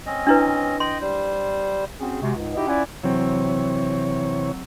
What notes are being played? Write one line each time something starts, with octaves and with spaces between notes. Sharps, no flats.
C4 C#4 D#5
D4 E4 B4
D#5 G5 C6
G3 C5
C4 C#4 F#4 G#4
C3 G#3 F#4
C#2 G#2
D#4 E4 F#4 G4 D#5 E5
C#4 E4 F4 D5 F#5 G#5
C3 E3 F#3 C4 C#5